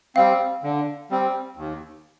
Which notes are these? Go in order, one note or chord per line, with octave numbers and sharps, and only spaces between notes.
G3 C4 F5
D3
G3 C4
D#2